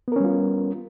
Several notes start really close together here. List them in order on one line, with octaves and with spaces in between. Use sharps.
B3 A#4 C#4 G3 F4